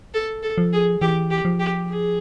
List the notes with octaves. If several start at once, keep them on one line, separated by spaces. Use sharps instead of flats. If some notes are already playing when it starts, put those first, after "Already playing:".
A4
A4
F3
G#4
E3 G4
G4
F3
G4
G#4